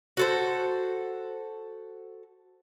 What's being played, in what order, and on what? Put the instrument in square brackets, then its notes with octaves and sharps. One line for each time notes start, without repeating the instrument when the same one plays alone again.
[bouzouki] F#4 A4 C5